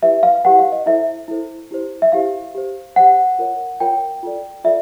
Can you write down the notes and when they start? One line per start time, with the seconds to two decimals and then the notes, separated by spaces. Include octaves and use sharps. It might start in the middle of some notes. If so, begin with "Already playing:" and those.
0.02 E4 G4 B4 E5
0.23 F5
0.44 E4 G4 B4 F#5
0.59 F5
0.72 D#5
0.86 E4 A4 C5 E5
1.28 E4 A4 C5
1.71 E4 G4 C5
2.02 E5
2.12 E4 G4 C5 F5
2.55 G4 C5
2.96 G4 C5 F#5
3.39 F4 A#4 C#5
3.80 F4 A#4 C#5 G5
4.23 F4 A4 D5
4.64 F4 A4 D5 E5